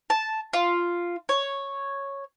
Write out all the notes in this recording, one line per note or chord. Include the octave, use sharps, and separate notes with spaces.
A5
F4
C#5